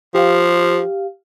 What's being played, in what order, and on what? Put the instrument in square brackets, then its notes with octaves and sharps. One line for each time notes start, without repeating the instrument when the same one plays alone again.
[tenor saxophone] F3 [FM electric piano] G4 F5